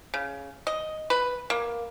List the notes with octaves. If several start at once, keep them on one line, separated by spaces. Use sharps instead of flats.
C#3
D#5
B4
A#3